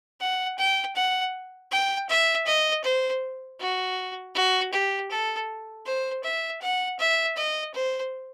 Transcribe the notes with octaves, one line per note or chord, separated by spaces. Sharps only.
F#5
G5
F#5
G5
E5
D#5
C5
F#4
F#4
G4
A4
C5
E5
F#5
E5
D#5
C5